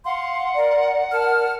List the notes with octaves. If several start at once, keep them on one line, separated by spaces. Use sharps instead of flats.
F5 F#5 C6
A#4 D5
A#4 A5 F6